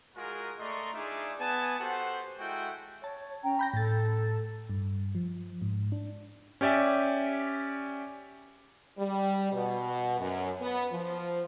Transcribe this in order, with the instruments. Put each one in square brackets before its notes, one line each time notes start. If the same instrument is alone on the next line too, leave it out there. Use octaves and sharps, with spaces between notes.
[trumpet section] G#3 F4 F#4 G#4 A#4
A3 D5 D#5 A#5 C6 C#6
D4 D#4 F4 G#4 D5 E5
B3 G#5 A5
F#4 G4 A4 C5 F#5
G#3 E4 F#4 A4 G5
[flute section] C#5 [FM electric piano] A5
[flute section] C#4 G5 A#5
[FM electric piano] B5 G6 A#6
[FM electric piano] A2 A6 [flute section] A4
[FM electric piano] G2
F3
G#2
D4
[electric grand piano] C#4 G4 D5 E5 G#5
[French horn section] G3
B2
F#2
B3
F3